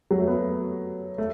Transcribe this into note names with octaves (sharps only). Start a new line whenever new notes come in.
F#3
A3
B3
A3